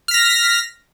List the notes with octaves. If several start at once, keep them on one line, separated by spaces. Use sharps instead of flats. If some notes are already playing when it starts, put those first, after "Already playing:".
F6 A#6 B6